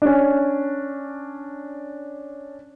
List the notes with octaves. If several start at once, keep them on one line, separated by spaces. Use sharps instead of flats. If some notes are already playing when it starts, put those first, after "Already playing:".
C#4 D4